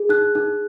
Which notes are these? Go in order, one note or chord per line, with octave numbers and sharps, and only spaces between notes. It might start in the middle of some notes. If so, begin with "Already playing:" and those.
Already playing: G#4
D#4 F#6
D#4